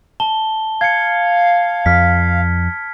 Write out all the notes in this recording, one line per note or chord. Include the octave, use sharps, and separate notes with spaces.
A5 G7
F5 G#6 C#7
F2 F6 B6